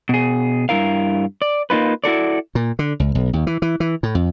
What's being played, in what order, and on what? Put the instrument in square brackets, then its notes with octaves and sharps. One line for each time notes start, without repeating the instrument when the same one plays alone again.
[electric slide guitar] B2 G#4
G2 F3 E4 A#4 F5
D5
A#3 D#4 F4 B4
E4 F#4 A4 D5
[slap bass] A#2
D3
C#2
B1
D#2
E3
E3
E3
A2
F2